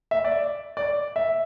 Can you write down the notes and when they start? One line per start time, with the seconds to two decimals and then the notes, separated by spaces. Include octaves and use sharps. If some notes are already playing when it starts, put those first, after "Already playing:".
0.11 E5
0.25 D5
0.77 D5
1.16 E5